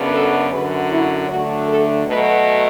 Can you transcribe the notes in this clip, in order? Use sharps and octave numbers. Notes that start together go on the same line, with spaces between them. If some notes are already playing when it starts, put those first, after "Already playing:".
Already playing: F#2 C#3 F#3 B3 D4
A4
F#2 D3 F#3 C#4 B4
E4
D2 D3 F#3 A3 D4 F#4
A4
B2 F#3 A3 B4